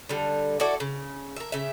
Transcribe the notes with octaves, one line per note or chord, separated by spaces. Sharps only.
D3 G3
E4 F#4 A4 D5
C#3
A#4 E5
C#3 E5